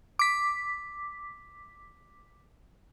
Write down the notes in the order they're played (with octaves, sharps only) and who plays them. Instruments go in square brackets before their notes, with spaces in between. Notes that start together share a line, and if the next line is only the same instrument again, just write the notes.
[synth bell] D6 B6